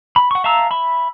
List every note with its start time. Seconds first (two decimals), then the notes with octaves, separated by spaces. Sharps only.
0.16 B5
0.31 F#5 C#6
0.44 E5 F5 A5 A#5 E6
0.71 E5 B5